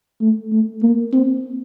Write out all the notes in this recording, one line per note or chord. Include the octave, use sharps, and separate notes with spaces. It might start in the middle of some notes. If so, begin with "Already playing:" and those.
A3
A3
A#3
C4